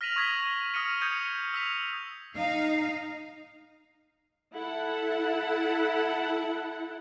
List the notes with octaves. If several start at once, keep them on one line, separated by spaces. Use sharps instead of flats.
F6 A#6 B6 D#7 F7 F#7
C#6 D#6 G#6 A#6 B6
D#6 F6 A#6 C#7 D#7
D#6 G6 G#6 C#7 D#7
E6 B6 F7
D#4 F5
E4 A4 F#5